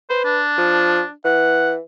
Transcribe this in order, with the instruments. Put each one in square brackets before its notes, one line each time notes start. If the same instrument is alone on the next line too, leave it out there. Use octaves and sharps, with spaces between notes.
[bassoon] B4 [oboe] C5
[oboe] D4
[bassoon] F3
[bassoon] E3 [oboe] F#5